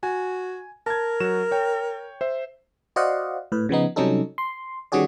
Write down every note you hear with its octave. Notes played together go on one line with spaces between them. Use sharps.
F#4 G#5
A#4 A5 G#6
F#3 F#4 E7
C#5 G5
C5 E5
F#4 C5 D5 D#5 F5 F#5
A2 B4
C#3 F3 B3 D#4
C3 F#3 G3 C#4 D#4 A4
C6
D#3 G3 C#4 F#4 G#4 D5